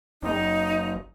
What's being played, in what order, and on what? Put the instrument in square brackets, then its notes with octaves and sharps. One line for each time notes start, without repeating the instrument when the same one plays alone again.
[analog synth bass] F#1 [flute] D#4